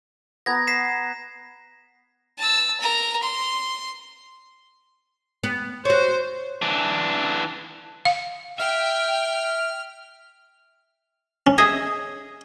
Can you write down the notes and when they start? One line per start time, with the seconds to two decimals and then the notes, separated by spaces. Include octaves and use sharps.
0.46 B3 A#5 G#6 A#6
0.67 B6 C7 E7
2.38 A5 E6
2.80 A#4 A#5
3.23 C6
5.43 B3
5.85 F#4 C5 C#5
6.62 E3 D4
8.05 F5
8.60 E5 G5 F6
11.47 C#4
11.58 G#4 D#5 E5